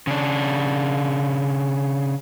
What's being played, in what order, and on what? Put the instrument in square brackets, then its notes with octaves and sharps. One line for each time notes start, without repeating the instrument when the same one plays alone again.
[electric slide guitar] C#3 D4